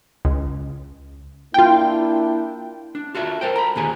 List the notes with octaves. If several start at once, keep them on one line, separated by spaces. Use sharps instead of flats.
C#2
A#3 D4 E4 F4 G5
D4
F4 F#4 A4 E5
A4 A#4 C5 G5
A#5 B5
D#2 A#2 D3 G4 G#4 G#5